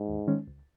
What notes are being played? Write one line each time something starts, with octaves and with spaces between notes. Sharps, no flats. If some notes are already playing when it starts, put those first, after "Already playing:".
Already playing: G#2
D#2
D#3 G#3 C#4
C#2